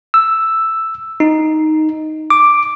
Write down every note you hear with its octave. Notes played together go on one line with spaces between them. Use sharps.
E6
D#4
D6